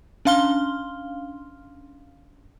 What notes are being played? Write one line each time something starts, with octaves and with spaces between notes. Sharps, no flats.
C#4 D4 F5 C6 F6 G7